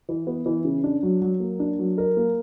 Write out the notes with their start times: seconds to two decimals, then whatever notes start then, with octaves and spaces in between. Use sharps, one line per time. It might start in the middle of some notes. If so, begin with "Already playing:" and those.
0.09 E3
0.27 B3
0.46 E3
0.65 C#3
0.84 D4
1.03 F#3
1.22 F#3
1.40 A#3
1.60 D4
1.79 F#3
1.98 A#4
2.17 A#3